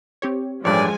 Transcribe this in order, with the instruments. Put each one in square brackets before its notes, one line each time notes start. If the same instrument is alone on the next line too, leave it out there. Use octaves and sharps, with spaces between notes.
[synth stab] C4 G4 C#5
[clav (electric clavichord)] A1 G2 [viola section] F3 G#3 G#5 [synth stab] C#5 [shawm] D5